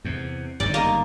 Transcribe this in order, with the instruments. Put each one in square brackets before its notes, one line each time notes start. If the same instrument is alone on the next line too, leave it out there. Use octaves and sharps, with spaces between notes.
[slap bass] E2 C3
[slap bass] G1 F#2 D#3 [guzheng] D5
[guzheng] A#3 D#5